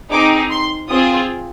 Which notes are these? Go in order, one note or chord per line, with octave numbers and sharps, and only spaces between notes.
C4 D#4 G#4 D6
C6
C4 F4 G#4 D#6